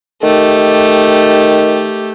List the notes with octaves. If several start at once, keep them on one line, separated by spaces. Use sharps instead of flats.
D#3 A3 G4